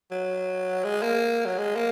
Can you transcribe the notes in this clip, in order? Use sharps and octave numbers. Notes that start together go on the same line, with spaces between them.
F#3
G#3
A#3
F#3
G#3
A#3